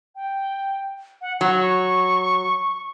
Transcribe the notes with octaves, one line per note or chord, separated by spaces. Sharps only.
G5
F#5
F#3 C#6